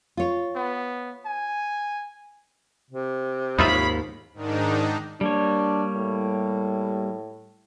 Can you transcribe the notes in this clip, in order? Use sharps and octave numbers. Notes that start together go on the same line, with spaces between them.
F4 C#5
B3
G#5
C3
D#2 G#2 D#4 F4 C#5 E5 F5 B5
G#2 D#3 D4 D#4
G3 A#3 D4 C#5
A2